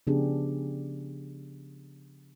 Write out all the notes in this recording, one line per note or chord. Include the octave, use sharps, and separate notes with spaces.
C#3 F3 B3 D4 G4 G#4